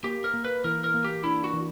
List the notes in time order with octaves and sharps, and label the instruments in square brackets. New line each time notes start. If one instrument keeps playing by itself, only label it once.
[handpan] A#3 [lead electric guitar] G4
[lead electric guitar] A#4
[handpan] A#3
[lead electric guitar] B4
[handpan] E3 [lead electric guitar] A#4
[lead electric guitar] A#4
[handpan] A#3
[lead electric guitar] G4
[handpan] D4 [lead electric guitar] E4
[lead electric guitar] F#4
[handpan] E3